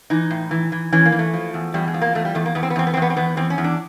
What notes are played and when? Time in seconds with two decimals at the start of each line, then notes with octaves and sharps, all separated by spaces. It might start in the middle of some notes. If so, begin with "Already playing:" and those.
0.10 E3 D#4
0.30 A2
0.51 E3
0.72 E3
0.92 E3 C#4
1.05 A#3
1.12 E3
1.19 A3
1.34 F3
1.54 E2
1.74 E2 G3
1.88 G#3
1.94 F3
2.01 A#3
2.15 E2 A3
2.25 G3
2.35 E2 A3
2.46 A#3
2.55 E2 B3
2.63 C4
2.70 B3
2.76 E2 C4
2.87 B3
2.93 C4
2.97 E2 B3
3.10 C4
3.17 E2 B3
3.37 E2 C4
3.50 C#4
3.58 E2
3.64 D4